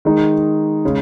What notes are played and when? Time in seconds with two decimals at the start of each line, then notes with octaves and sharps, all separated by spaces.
0.05 D#3 G#3 D#4
0.85 C#3 G#3